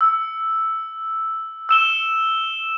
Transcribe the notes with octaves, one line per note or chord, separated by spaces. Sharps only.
E6
E6 E7 G7